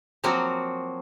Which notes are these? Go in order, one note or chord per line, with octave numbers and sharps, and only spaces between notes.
F3 F#3 A#3 C4 F#4